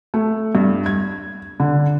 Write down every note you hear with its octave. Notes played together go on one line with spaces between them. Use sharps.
A3
G2
G#6
D3